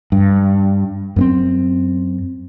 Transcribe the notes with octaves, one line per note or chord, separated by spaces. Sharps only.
G2
F#2 B3 C4